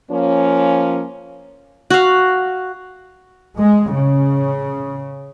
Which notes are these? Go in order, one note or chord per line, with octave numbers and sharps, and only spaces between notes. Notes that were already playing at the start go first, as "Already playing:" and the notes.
F3 A#3 C#4
F#4 F5
G#3
C#3